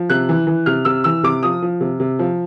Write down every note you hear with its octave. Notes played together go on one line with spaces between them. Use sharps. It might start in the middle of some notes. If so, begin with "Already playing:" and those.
Already playing: F3
C3 F#6
E3
E3
C3 F6
C3 E6
E3 E6
C3 D6
F3 D#6
F3
C3
C3
F3